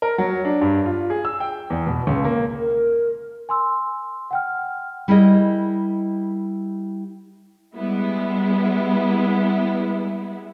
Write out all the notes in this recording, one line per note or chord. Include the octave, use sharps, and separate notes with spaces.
A#4
F#3
D4
G2
F4
G#4
E6
G5
E2
B2
C#2
A#3
A#4
G#5 C6 E6
F#5 G5 F6
G3 E4 G#4 A#4 D#5
G3 G#3 B3 E4